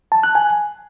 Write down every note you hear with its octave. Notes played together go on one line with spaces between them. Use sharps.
A5
F#6
G#5